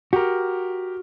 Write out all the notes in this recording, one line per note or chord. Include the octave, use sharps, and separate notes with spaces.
F#4 G4 A#4